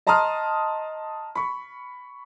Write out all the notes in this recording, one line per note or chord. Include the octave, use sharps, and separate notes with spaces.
D#5 A5 A#5 C6 D#6 F6
B5 C#6